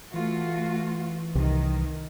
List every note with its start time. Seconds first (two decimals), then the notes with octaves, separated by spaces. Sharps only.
0.14 E3 A3 F4 F#4
1.35 C2 D#3